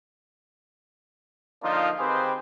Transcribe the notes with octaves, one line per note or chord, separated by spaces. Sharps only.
D3 F3 A#3 D4 D#4 F4
D#3 C4 G4 G#4 B4 C5